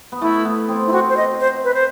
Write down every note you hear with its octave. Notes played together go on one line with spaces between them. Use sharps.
B3
A3 E4
B3
C4
E4
C4 F#4
C5
D#5
C5
B4
C5